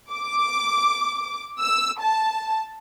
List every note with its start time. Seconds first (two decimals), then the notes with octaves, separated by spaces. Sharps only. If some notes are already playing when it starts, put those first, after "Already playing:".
0.12 D6
1.59 E6
2.00 A5